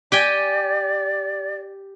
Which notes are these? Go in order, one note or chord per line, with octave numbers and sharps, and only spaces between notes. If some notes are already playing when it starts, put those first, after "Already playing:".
G4 D5 G5 G#5